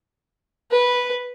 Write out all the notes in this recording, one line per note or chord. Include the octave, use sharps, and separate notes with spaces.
B4